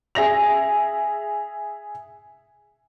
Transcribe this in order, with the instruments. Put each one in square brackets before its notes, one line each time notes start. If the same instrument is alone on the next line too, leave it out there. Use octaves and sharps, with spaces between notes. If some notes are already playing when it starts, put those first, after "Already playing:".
[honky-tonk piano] G#4 E5 A#6 F7